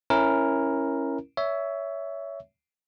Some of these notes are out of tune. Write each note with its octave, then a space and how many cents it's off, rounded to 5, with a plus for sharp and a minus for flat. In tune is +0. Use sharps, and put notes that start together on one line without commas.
C#4 -15 E4 +0 A#4 +5
C#5 +20 E5 +0